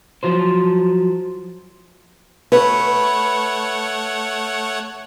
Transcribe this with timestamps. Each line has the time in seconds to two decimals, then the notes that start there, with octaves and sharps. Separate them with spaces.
0.23 F3 F#3 C5
2.52 A3 B4 C#5 F#5